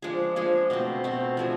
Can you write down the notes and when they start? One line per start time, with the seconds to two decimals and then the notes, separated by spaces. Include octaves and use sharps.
0.02 F3 G#3 D4 G#4
0.36 F3 G#3 D4 G#4
0.70 B2 A3 C4
1.04 B2 A3 C4
1.37 F3 A3 D4 G#4